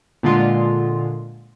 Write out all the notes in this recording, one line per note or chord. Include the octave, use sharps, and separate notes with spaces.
A#2 D3 G#3 F4